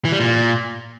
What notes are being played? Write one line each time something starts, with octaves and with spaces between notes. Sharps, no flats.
E3
G3
A#2